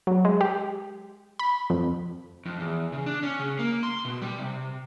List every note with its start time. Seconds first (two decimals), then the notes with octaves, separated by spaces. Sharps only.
0.07 F#3
0.25 G#3
0.41 G4
1.39 B5
1.70 F2
2.46 F2
2.60 E2
2.93 C#3
3.06 D4
3.23 C#4
3.39 C#3
3.59 A#3
3.83 C6
4.05 B2
4.22 G3
4.38 C3